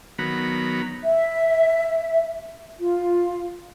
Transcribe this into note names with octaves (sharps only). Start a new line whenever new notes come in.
D#3 F#3 B3 A#5 B5
E5
F4